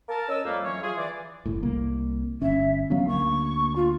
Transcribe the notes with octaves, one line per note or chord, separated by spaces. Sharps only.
A#4 A5
C#4 D#5 E6
F2 G3 A3 A#3
E3 F#3 C#4 C#5
F4 G#4
E3 D5
F#1 A2
C2 A#3
G1 C#4 E5
F#3 B3 C#4 F5
D2 A#3 C#6
F4